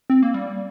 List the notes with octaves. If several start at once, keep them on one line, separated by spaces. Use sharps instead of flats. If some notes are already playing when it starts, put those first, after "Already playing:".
C4
A#3
G3